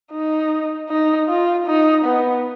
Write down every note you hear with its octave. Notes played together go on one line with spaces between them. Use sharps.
D#4
D#4
F4
D#4
B3